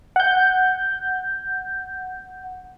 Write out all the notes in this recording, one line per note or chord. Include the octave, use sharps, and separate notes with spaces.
F#5 G6